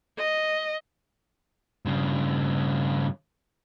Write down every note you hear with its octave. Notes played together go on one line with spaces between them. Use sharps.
D#5
G2 C#3